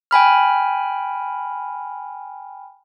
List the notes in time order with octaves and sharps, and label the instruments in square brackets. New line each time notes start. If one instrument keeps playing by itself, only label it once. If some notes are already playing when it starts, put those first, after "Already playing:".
[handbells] G5 G#5 B5 F6